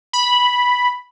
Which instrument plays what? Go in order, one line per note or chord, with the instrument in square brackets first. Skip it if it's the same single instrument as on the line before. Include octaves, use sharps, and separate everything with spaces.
[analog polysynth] B5